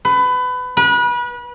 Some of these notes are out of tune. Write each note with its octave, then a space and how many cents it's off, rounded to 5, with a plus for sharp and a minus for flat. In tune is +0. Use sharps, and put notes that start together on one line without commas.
B4 +25
B4 -30